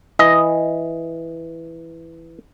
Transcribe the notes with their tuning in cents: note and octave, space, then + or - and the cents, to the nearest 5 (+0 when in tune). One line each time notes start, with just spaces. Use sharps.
E3 +0 D#5 +5